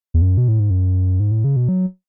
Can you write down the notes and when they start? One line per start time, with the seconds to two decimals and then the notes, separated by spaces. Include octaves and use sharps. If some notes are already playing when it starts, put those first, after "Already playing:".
0.14 E2
0.22 F#2
0.38 B2
0.48 A2
0.60 G#2
0.70 F#2
1.20 G#2
1.31 A2
1.44 C#3
1.56 B2
1.69 F#3